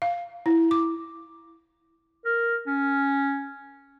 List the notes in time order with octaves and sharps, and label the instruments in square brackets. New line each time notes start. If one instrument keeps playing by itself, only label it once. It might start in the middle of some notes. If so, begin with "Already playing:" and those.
[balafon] F5
E4
D6
[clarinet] A#4
C#4